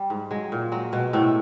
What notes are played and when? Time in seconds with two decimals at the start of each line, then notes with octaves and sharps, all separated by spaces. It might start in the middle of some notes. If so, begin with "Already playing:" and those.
Already playing: G3
0.10 G#2
0.31 F#3 G#3
0.52 A#2
0.72 F#3 G#3
0.92 B2 G#3
1.13 A2 C3 A3